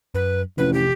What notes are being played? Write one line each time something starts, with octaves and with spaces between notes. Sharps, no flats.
F#2 B4
A1 C3 F3 B4
G4